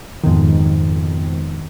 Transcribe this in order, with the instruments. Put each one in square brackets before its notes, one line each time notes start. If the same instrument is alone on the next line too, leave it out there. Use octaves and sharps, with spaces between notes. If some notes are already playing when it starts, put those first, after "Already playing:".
[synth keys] F2 G#2 B2 D#3